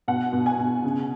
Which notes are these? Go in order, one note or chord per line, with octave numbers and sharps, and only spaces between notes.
B2 F#5
B2
G#5
B2
C#3